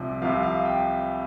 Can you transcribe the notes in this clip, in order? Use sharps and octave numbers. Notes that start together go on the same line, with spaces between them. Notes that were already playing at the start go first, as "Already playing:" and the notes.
Already playing: C2 C3 F3 D5
C2 C3 F3 F5
F5
G5